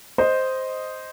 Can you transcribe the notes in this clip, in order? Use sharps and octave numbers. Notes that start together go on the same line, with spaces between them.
C5 D#5